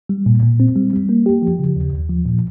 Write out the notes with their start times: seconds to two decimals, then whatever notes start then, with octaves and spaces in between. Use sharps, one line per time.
0.09 G3
0.26 A#2
0.42 A#2
0.60 C4
0.76 G3
0.93 G3
1.09 A#3
1.26 G4
1.42 F3
1.59 C#3
1.76 D#2
1.93 D#2
2.09 F3
2.26 A#2